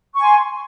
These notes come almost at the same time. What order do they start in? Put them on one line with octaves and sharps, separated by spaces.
C#6 G#5 C6